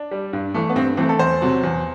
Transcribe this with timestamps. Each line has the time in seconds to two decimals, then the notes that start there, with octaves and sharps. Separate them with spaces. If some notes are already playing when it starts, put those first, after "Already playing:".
Already playing: D4
0.11 G3
0.33 G2
0.54 E3 A3
0.70 B3
0.76 G2 C4
0.97 E3 A3 C4
1.09 A4
1.19 E2 C5
1.42 C3 F#3
1.63 E2